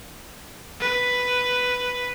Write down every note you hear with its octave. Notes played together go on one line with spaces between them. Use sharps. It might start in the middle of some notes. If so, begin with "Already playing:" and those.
B4